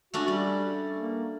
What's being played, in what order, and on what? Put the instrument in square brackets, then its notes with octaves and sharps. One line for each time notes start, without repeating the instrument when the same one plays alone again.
[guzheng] A3 C#4 D4 [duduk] F#4
[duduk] G3 [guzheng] D5
[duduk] A#3